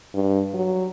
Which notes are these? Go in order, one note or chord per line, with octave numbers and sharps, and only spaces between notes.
G2
F#3